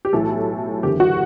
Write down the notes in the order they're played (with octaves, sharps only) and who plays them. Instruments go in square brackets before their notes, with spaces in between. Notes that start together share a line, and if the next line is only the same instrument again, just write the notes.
[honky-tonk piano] G4
B1 A2 E3 A4
F#1 E2 D3 G4
F#4